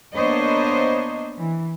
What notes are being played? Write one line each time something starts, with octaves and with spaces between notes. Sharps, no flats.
A#3 B3 D4 C5 C#5 D#5
E3